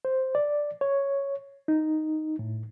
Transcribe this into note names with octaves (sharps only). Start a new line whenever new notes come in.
C5
D5
C#5
D#4
A2